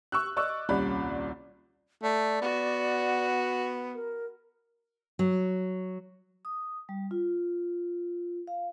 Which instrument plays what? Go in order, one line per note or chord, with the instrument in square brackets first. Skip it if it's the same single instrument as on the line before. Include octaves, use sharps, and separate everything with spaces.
[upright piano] C#6 E6 F#6
D5 D#5 C#6 E6 F#6
D#1 C2 C#4 D5 B5
[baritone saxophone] A3 [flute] D5
[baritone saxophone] B3 [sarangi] F#4
[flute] A#4
[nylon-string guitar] F#3
[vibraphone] D#6
G3
F4
F5